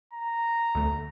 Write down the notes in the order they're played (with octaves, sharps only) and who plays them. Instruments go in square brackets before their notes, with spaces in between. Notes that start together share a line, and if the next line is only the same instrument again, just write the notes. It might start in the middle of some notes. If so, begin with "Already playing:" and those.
[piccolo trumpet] A#5
[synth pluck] D2 A3